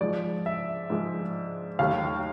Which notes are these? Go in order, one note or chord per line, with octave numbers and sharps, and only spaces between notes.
G#2 F3 G#3 D5
E5
G#2 F3 G#3
D#2 D#3 F#3 A3 F5